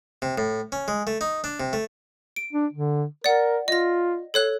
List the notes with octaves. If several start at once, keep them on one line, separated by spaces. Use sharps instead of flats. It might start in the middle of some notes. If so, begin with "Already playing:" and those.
C3
A2
C#4
G#3
A3
D#4
D4
C3
A3
D7
D4
D3
A#4 D5 F#5
F4 D#5 A#6
A4 C#5 F#6